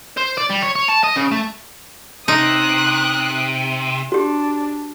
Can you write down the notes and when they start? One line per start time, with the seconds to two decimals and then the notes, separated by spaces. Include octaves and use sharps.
0.17 C5
0.37 D5
0.50 G3
0.62 C#5
0.76 C#5
0.89 A5
1.04 D#5
1.16 C#3
1.31 A3
2.28 C3 D#4 D#6 F#6
4.12 D4 F#4 G4